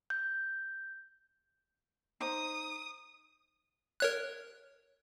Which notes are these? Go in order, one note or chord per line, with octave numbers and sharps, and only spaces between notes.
G6
D#4 C5 A#5 D#6
A#4 C#5 F#6